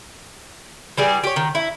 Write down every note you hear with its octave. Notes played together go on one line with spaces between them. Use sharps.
E3 G3 G#4
G4 C#5
D#3
E4